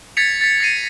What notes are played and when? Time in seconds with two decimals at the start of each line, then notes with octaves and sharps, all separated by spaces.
0.17 G#6 A6 B6 C#7 F7
0.41 A6 B6
0.60 A6 A#6 C7 C#7 D#7